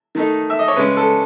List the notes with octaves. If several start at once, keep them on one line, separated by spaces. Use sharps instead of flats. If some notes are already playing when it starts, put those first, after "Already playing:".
D#3 A3 D#4
E5
D#5
C#5
C#3 G#3 C#4 B4
A4